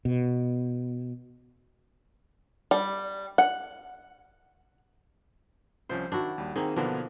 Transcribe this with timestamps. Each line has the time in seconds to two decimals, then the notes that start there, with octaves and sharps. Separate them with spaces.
0.05 B2
2.71 G3
3.38 F#5
5.89 C2 F3 C#4 C5
6.12 D#3 D4 E4 F#4
6.38 D#2 G3
6.56 D#3 A#3 C4 G#4
6.76 B2 D3 F3 B3 D4 A#4